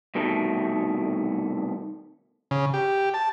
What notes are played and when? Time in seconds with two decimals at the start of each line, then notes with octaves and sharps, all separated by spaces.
0.15 C2 B2 D#3 A3
2.51 C#3
2.74 G4
3.14 A5